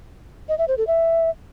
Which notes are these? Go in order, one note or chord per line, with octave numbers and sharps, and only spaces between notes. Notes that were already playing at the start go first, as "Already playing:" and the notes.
D#5
E5
C5
A4
E5